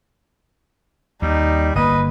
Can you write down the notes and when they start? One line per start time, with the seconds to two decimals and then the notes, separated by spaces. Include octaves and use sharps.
1.22 D#2 G3 D#4
1.75 G1 A#3 B4 D#5